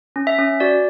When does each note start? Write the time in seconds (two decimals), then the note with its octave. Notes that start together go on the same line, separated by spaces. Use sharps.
0.16 C#4
0.27 E5
0.39 C#4
0.60 F#4 D5